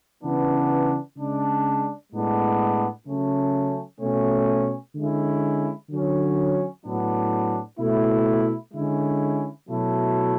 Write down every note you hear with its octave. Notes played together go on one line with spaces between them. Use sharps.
C#3 E3 B3 D4
C#3 G#3 D4
A2 G#3 B3 D4
C#3 F#3 A3 C#4
B2 A3 C#4
D3 G#3 C#4 E4
D3 F#3 C#4
A2 F#3 B3 D4
B2 A3 E4
D3 G#3 C#4 E4
B2 F#3 A3 E4